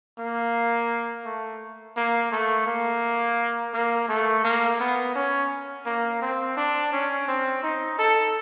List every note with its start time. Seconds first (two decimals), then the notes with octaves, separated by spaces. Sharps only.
0.19 A#3
1.26 A3
1.96 A#3
2.32 A3
2.67 A#3
3.74 A#3
4.09 A3
4.44 A#3
4.80 B3
5.15 C#4
5.86 A#3
6.22 C4
6.57 D4
6.93 C#4
7.28 C4
7.63 D#4
7.99 A4